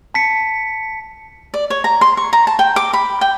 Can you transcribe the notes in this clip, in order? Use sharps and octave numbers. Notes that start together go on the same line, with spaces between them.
A5 B6 C#7
D5
C#5
A#5
C6
C#6
A#5
A5
G5
D6
B5
G5